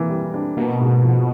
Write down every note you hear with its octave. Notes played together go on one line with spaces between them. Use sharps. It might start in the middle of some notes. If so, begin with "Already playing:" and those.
Already playing: E3 A#3
G3
D4
B2 A#3
G#2
F3